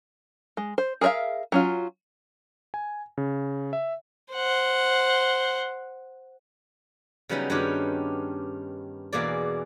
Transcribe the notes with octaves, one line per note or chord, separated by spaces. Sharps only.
G#3
C5
G#4 A#4 C#5 E5 F5
F#3 C#4 F4
G#5
C#3
E5
C5 F#5
C#3 F#3 G3 B3 C#4 D#4
G2 D#3 C#4 F#4 G4 F#5
E2 B2 A#3 G#4 D5